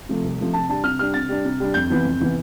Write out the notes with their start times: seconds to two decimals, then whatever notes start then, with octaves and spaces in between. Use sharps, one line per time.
0.09 C3 F3 A3
0.24 C2
0.39 C3 F3 A3
0.54 C3 A5
0.69 G3 D4 A5
0.84 C3 F6
0.99 G3 D4 F6
1.14 C3 A6
1.29 G3 D4
1.45 C3
1.60 G3 D4
1.74 F2 G6
1.90 C3 E3 B3
2.05 F2
2.20 C3 E3 B3